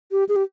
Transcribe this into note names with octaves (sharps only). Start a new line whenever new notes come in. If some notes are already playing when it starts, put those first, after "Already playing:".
G4
G#4
G4